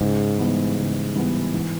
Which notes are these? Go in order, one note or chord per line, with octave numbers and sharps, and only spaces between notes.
G#2 C#3
E3 G3 B3
C#3
E3 G3 B3
E3